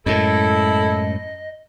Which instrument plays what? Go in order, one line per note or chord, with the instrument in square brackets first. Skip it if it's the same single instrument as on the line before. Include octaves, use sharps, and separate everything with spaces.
[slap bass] F#2 A2 [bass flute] G#3 [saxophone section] E4 A4 [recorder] D#5